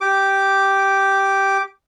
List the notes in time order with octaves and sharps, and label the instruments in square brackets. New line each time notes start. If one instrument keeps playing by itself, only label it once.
[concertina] G4 D6